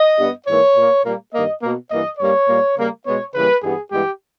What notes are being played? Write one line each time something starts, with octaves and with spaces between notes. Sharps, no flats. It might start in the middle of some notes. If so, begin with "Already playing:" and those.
Already playing: D#5
G2 G3 B3
G#2 E3 A#3 C#5
A#2 A#3
A#2 G3 A#3
G2 D#3 A#3 D#5
B2 A#3
G2 E3 A#3 D#5
G2 G3 A#3 C#5
A#2 G3 A#3
C#3 G3 A#3
B2 G#3 B3 C#5
C#3 E3 G3 A#3 B4
G2 E3 G3 B3 G#4
G2 E3 G#3 B3 G4